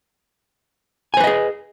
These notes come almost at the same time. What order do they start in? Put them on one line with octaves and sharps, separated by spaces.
G#5 C5 B4 D#5 G#4